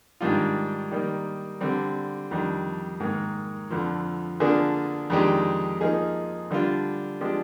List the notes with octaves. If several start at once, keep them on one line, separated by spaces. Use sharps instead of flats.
G#2 D#3 G3 D4 F4
D#3 G3 A#3
D3 G3 C4
F2 D#3 G3 D4
G#2 D#3 A#3
F2 D3 F3
D3 F3 A#3 D4 G#4
F2 D#3 G#3 D4 G4
F3 A#3 D#4 G#4
D3 G3 D4 F4
F3 G#3 D4 G4